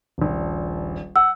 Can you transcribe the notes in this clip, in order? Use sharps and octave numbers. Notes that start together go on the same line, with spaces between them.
D#1 A#1
F#5 E6